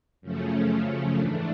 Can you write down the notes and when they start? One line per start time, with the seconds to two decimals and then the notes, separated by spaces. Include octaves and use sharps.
0.21 F#2 C#3 F3 A3 C#4
1.15 G#2 E3 A3 D4